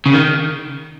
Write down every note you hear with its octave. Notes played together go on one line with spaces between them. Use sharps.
C#3
D#3